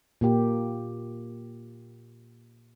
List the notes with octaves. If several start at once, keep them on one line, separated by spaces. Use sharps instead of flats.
A#2 A#3 G4